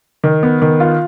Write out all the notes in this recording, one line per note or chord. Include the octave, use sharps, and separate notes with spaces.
D#3
B3
D#3
F4